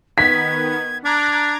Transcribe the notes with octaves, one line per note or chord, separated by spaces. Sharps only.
D#3 B3 G#6 B6
D4 A#5 D6 F#6 G#6